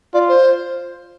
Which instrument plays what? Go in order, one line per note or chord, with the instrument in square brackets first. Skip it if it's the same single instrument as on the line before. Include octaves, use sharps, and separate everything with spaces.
[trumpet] F4 [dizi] D5
[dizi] C5